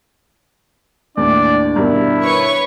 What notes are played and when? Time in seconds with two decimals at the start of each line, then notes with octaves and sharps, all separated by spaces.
1.17 D#2 A2 D4 D5
1.76 G2 B2 D#3 E4
2.23 B4 C#5 C#6